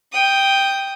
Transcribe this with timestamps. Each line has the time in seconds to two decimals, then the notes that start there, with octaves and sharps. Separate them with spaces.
0.12 G5 D#6